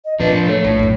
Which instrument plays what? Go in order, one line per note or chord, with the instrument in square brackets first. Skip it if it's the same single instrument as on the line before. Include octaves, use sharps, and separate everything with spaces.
[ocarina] D#5
[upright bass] A2 C3 [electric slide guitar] F3 D4 [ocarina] B4
[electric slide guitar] A3 [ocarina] C#5
[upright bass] A#1 [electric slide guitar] A2
[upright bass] A#1 F#2